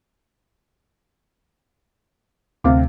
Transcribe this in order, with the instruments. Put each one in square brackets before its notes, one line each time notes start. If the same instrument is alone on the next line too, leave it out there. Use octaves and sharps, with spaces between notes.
[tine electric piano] D2 A3 C4 [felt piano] C3 F5 D6